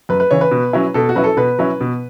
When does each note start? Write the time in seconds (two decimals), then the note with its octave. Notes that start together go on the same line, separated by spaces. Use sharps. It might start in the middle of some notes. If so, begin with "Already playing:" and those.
0.09 F#2 B4
0.20 B4
0.31 C#3 E3 C#5
0.41 B4
0.51 B2
0.73 F#3 C#4 E4
0.94 B2 A4
1.09 F#4
1.15 F#3 C#4 E4 B4
1.24 A4
1.37 B2 B4
1.59 F#3 C#4 E4
1.81 B2